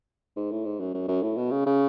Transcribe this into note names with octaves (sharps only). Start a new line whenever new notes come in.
G#2
A2
G#2
F#2
F#2
F#2
A2
B2
C#3
C#3